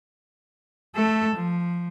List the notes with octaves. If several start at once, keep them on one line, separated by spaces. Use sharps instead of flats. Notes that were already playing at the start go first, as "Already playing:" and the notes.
A3 A4
F3